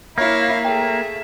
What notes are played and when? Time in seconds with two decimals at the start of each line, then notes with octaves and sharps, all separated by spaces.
0.18 A#3 E4 C#5 F5
0.65 A3 G#4 E5 G5